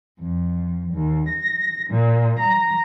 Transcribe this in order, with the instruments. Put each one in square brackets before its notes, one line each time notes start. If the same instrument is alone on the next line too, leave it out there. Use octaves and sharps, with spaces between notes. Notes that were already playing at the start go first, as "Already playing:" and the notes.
[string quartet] F2
D#2
A#6
A#2
A#5